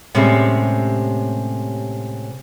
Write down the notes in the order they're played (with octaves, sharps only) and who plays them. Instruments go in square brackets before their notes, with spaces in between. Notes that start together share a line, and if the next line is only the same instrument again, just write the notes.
[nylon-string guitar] A2 C3 G3 G#3 C#4